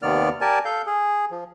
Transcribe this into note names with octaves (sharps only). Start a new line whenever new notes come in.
D#2 C3 D#3 B3 D5 F6
G4 A#4 D5 G#5 A5
A4 F5 G6
G#4
F3